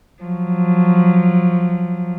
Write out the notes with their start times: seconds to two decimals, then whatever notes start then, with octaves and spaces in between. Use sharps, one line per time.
0.23 F3 F#3